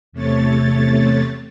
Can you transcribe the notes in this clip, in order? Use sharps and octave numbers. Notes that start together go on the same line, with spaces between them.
E2 C3 A3 C#5 A6